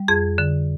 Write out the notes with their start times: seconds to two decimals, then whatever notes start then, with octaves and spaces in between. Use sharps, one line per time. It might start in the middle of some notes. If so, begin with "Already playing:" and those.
Already playing: G3
0.08 F2 G#4
0.38 D3